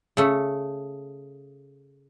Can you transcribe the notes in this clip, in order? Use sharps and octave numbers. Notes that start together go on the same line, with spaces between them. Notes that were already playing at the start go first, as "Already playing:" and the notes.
C#3 A3